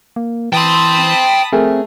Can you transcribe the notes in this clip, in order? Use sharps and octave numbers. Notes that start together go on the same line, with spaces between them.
A#3
E3 G5 A5 B5 C6 D#6
A3 C4 G#4 A#4